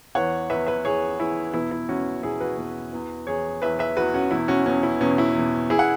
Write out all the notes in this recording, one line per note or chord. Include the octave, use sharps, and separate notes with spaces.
E2 E3 C#5 F#5
E2 E3 B4 E5
B4 E5
E2 E3 G#4 C#5
E2 E3 E4 G#4
E2 B2 E4
E4
E2 B2 C#4 F#4
E2 B2 E4 G#4
F#4 B4
E2 B2
E2 E3
E2 E3 G#4 C#5
E2 E3 B4 E5
B4 E5
E2 E3 F#4 B4
C#4 F#4
E2 B2 E4
C#4 F#4
E2 B2 C#4
E4
E2 B2 C#4
E4
E2 B2
E3 E4 G#4
F#5